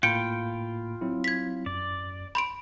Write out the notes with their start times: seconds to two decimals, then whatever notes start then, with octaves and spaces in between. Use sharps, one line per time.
0.03 A2 A#3 F4 G5 B5 C#7
1.01 F#3 C4 E4
1.24 G#6 B6
1.66 F#2 D5
2.35 B5 C6 D7